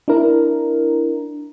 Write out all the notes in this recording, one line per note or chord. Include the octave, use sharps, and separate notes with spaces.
D4 E4 A#4